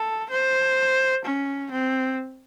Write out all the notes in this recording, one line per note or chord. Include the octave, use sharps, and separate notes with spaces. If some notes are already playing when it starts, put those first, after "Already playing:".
Already playing: A4
C5
C#4
C4